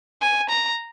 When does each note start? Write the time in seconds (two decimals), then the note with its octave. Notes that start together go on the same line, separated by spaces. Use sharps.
0.21 G#5
0.49 A#5